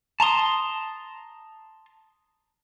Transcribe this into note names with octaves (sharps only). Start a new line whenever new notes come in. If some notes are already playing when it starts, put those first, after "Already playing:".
A5 A#5 C6 D#6